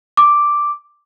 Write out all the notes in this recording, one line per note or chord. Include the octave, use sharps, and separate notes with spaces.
D6